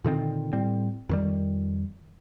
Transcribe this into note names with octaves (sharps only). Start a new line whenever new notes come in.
A#2 D3 D#3 C4
A2 G3 C4
F2 D#3 G3